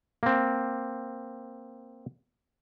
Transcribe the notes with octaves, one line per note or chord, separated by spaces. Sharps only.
A#3 C4